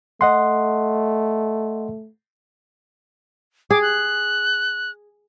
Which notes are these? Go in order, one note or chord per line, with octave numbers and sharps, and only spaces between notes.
A3 D#5 F#5 C6
G#4 D6
F#6